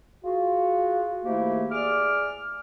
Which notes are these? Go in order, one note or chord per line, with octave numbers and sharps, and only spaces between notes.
F4 F#4 G#4
G#2 D#3 A3 A#3 E4 G4
G#4 D5 D6 F6